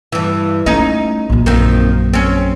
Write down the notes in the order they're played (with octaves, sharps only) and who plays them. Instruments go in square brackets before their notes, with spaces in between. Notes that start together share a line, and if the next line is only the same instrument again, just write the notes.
[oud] G2 E3
[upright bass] A3 [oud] C#4 D#4
[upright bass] A#1 F#2
[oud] D#3 F3 C4
C4 C#4